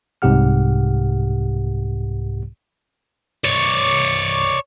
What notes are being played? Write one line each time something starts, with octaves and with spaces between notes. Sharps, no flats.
C2 G#2 C3 G4 F#5 F6
C#5 D5